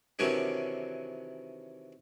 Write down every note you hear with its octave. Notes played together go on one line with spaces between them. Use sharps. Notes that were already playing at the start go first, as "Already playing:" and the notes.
C3 D#3 E3 F#3 C#4 D4